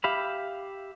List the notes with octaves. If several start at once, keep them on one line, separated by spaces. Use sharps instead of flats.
G4 E5 F5 B5